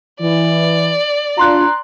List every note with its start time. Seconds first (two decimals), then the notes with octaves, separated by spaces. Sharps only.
0.21 E3 D5
1.37 D4 F4 A#5 C6 F#6